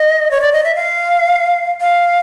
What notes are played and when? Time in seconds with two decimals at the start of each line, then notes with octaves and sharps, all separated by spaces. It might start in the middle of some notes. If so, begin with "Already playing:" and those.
Already playing: D#5
0.31 C#5
0.41 D5
0.53 D#5
0.64 E5
0.75 F5
1.81 F5